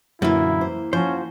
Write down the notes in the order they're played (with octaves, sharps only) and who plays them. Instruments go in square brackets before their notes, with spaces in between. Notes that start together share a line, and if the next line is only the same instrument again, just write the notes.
[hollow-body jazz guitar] F#2 [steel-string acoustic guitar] A#2 D3 [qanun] E3 A#3 [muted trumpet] E4
[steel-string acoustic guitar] C5
[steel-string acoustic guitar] F3 F#4 [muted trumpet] C#4 [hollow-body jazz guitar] C5